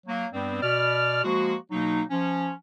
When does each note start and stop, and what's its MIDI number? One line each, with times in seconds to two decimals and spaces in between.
0.07 0.26 54
0.07 0.26 58
0.33 0.58 43
0.33 0.58 55
0.33 0.58 59
0.33 0.58 60
0.62 1.20 47
0.62 1.20 74
0.62 1.20 89
1.23 1.54 53
1.23 1.54 56
1.23 1.54 58
1.23 1.54 66
1.71 2.02 47
1.71 2.02 54
1.71 2.02 58
1.71 2.02 63
2.10 2.51 53
2.10 2.51 61